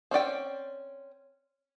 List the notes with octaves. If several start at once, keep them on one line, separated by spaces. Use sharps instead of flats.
C4 C#4 D5 G5